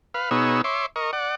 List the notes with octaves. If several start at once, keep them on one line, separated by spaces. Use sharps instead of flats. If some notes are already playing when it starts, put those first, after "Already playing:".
B4 F5
B2 B3 D#4 G#4 C#5 E6
C#5 E5 C6 D6
A#4 D#5 C#6
D5 F#5